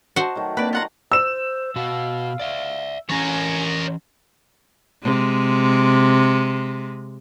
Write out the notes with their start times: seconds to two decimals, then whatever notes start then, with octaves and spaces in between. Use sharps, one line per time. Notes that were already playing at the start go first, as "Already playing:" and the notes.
0.16 F#4 C5 D#5 A5
0.35 D#3 F#3 A3
0.57 A#3 C4 D4 B4 D5
0.73 F4 F#5 A#5
1.12 C5 E6 E7
1.76 B2 F#4 F5
2.40 D5 E5
3.10 E3 C#4 A#4 C#5 G#5
5.03 C3 G#3